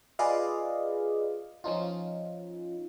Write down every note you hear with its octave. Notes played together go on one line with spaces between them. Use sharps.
F4 G#4 B4 D5 D#5 F5
F3 C#4 D#4 F4